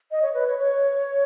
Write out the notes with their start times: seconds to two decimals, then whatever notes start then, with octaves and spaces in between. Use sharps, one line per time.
0.11 D#5
0.22 C#5
0.34 B4
0.47 C#5
0.59 C#5